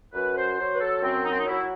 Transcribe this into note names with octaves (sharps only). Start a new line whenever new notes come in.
F#2 B4
C5
F#3 C5
B4
A4
F#2 C4
D#4
C4
D#4
F#3 E4